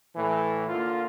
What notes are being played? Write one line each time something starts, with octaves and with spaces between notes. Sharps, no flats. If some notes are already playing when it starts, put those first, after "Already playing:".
A2 E3
D3 A#3 F4